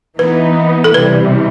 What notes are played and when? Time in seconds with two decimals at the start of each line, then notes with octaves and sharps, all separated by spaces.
0.18 E3 B3 D#4 B4
0.84 A4
0.94 C3 E3 G3 B4